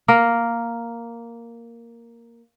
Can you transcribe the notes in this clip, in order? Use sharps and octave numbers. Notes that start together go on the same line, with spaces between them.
A#3 A#4